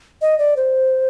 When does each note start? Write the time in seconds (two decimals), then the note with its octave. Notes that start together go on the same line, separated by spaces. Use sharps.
0.22 D#5
0.39 D5
0.57 C5